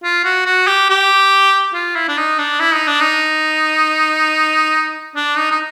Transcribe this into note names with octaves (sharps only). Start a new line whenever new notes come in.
F4
F#4
F#4
G4
G4
F4
E4
D4
D#4
D4
E4
D#4
D4
D#4
D4
D#4
D#4